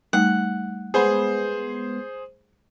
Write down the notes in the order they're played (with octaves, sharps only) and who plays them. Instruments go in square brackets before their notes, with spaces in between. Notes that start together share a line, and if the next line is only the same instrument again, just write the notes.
[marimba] G3 A3 D#4 [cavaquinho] F#5
[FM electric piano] G#3 B3 [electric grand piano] G#4 C5